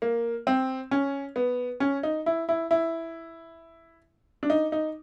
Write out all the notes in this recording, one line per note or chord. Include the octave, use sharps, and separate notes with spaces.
A#3
C4
C#4
B3
C#4
D#4
E4
E4
E4
D4
D#4
D#4